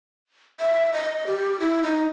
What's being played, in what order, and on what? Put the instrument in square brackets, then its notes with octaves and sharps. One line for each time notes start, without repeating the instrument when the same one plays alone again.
[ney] E5
D#5
G4
E4
D#4